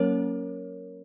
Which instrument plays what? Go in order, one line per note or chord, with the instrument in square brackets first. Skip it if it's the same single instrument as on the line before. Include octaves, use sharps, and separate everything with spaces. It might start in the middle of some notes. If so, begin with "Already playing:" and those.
Already playing: [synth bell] F#3 A#3 C#4 A#4 C#5